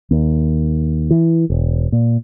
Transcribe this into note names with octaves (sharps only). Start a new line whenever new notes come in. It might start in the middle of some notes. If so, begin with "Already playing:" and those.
D#2
E3
E1
A#2